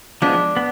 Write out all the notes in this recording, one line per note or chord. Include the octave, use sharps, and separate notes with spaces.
F3 G#3 B3 D4
B3